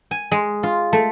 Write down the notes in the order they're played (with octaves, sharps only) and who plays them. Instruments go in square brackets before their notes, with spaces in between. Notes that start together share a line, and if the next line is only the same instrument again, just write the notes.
[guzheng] G#5
G#3
F4
A3